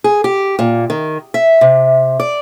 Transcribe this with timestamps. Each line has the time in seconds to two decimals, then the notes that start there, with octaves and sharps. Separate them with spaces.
0.04 G#4
0.24 G4
0.59 A#2
0.90 D#3
1.34 E5
1.61 C3
2.20 D5